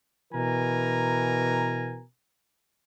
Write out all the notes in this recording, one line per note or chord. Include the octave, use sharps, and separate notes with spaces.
B2 E3 A#4 G#5 A#5